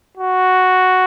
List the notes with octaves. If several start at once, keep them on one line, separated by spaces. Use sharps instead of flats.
F#4